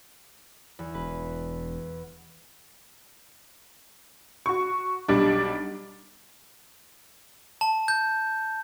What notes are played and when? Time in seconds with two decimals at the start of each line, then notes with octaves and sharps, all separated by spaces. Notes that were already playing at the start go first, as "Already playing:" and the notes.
0.79 E2
0.94 E1 B4
4.46 F#4 C#6
5.08 B1 G3 D4
7.61 A5
7.88 G6